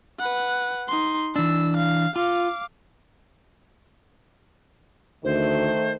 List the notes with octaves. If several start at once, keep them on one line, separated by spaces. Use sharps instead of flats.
B4 F#5
D#4 C6
E3 D4 E6
F5
F4 F5 D6
D2 D#3 A3 C5